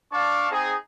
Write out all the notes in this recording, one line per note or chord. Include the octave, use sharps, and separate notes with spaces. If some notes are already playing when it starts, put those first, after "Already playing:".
D4 D5 F5 A5 C#6
C4 D#4 G#4